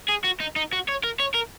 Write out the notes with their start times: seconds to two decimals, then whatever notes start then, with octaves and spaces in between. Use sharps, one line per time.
0.09 G#4
0.25 F#4
0.41 D#4
0.56 D#4
0.73 F#4
0.88 C#5
1.04 A#4
1.20 C#5
1.35 A#4